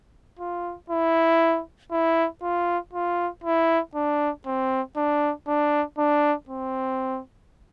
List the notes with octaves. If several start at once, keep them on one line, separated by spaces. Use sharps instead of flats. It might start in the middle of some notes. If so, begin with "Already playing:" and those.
F4
E4
E4
F4
F4
E4
D4
C4
D4
D4
D4
C4